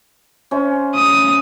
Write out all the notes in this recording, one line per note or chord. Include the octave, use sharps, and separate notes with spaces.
C#4 C5 E5
D#6